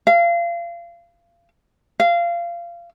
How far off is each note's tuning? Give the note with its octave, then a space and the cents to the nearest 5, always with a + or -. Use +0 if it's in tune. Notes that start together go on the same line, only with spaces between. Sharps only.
F5 -30
F5 -20